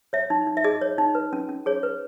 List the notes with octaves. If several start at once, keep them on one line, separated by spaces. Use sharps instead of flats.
C#5 E5
D#4
D#4
E5
G#4 D#5
C#5
D#4
B4
C#4
C#4
G#4 C#5
B4